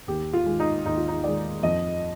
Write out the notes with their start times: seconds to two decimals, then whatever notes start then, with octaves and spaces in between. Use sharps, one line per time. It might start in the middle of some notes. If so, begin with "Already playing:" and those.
0.08 D#2 G4
0.33 F4
0.46 D#3 G#3
0.60 D#4
0.85 D#2 D#4
0.97 F4
1.08 D#4
1.24 D#3 G#3 D5
1.63 F2 D#5